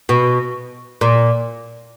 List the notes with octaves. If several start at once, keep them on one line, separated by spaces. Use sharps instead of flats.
B2
A#2